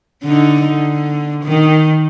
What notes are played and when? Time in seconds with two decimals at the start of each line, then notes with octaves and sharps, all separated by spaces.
0.23 D3 D4 D#4
0.62 D3
1.44 D#3